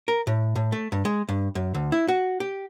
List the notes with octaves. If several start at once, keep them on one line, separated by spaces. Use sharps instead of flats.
A#4
A2
A2
A3
G2
G#3
G2
F#2
D2
E4
F#4
G4